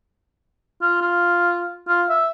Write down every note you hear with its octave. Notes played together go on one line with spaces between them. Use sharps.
F4
F4
F4
E5